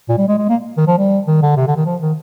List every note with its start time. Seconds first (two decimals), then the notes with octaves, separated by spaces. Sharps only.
0.09 A#2
0.18 G3
0.28 G#3
0.38 G#3
0.49 A#3
0.77 D#3
0.87 F3
0.98 G3
1.27 D#3
1.42 D3
1.57 C3
1.67 D3
1.76 D#3
1.86 F3
2.02 D#3